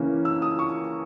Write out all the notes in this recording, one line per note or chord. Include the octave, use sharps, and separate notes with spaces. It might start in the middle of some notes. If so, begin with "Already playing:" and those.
Already playing: C#3 E3 A#3 C#4
E6
D#6
C#6